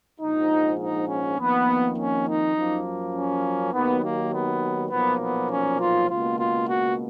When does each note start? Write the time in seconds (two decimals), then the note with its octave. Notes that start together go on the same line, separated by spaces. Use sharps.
0.21 A#1 G#2 F3 D#4
0.80 D#4
1.09 C#4
1.38 F2 D#3 A#3 B3
1.97 C#4
2.27 D#4
2.56 F#2 F3 A#3
3.15 C#4
3.73 D#2 D#3 F#3 A#3 B3
4.02 A#3
4.32 B3
4.91 B1 A#2 F3 A#3 B3
5.20 B3
5.49 C#4
5.79 F4
6.08 C#2 B2 A#3 F4
6.38 F4
6.67 F#4